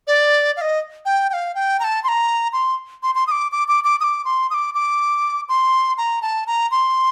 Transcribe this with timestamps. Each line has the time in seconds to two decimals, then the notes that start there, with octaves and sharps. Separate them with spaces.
0.07 D5
0.57 F5
0.61 D#5
1.05 G5
1.30 G5
1.33 F5
1.55 G5
1.80 A#5
1.84 A5
2.04 C6
2.08 A#5
2.53 C6
3.03 C6
3.15 C6
3.27 D#6
3.31 D6
3.52 D6
3.68 D6
3.84 D6
4.00 D#6
4.04 D6
4.25 C6
4.50 D#6
4.54 D6
4.74 D6
5.49 C6
5.98 A#5
6.22 A5
6.47 A#5
6.71 C6